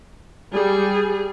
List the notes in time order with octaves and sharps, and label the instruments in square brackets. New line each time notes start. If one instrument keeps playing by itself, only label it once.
[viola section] G3 [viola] G#4